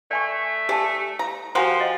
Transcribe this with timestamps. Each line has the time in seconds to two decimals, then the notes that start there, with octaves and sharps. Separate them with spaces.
0.11 A3 D5 G#5 C#6
0.69 G4 D5 G#5 A5
1.19 A#5
1.55 F3 F#4 G4 A#4 G#5 C6
1.81 D#5